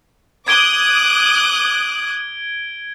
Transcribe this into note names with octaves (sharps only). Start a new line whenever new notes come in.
D6 D#6 F#6 G#6 D7 G7